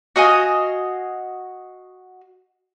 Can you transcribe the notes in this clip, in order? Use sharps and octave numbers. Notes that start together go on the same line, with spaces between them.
F#4 D#5 F5 G#5